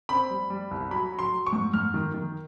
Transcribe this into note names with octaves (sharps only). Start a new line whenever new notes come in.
C4 B5
G3
G3
C2
F#3 B5
F#3
C6
F#3
C#6
G#2
G#2 F6
D#3
D#3